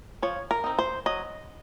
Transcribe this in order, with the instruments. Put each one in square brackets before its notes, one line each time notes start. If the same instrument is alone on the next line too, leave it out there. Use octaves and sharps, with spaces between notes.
[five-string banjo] F3 C#5
A#4
C4 D#4
C5
F#3 D#5